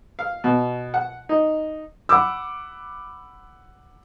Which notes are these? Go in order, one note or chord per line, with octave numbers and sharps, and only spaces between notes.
F5
B2
F#5
D#4
F#5 B5 D6 E6